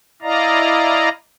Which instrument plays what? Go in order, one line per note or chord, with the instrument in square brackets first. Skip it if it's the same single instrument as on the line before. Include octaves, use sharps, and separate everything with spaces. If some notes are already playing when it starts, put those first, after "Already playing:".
[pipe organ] E4 D5 D#5 F5 A#5